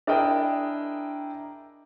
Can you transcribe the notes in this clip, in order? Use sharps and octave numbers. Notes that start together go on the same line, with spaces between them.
D4 E4 G#4 A#4 D#5 G5